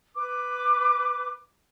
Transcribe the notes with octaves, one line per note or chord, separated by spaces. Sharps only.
B4 D6